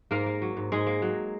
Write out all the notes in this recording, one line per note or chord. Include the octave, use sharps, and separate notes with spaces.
G#2 A#3 A#4
A#3
F#3
G#2
G#2 G#3 G#4
A#3
F#3